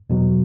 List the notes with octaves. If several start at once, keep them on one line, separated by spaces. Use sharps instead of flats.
E2 B2 F#3